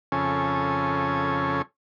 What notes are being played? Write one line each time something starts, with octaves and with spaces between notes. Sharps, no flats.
F2 C#3 C#4 A4 G#5